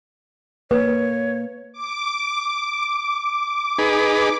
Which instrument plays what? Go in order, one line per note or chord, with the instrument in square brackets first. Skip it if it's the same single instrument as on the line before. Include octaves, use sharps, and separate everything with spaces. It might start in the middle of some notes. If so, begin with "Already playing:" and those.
[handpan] A#3 [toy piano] B4 [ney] C#5
[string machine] D6
[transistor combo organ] D#4 G#4 B4